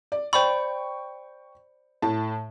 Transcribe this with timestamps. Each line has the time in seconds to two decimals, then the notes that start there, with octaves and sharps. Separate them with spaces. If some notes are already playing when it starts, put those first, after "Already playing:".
0.12 D5
0.33 C5 D5 G5 B5 C#6
2.02 A2 A5